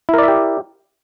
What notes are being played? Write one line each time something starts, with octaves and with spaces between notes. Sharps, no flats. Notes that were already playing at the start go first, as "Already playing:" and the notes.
E4 G4 A#4 D5 E5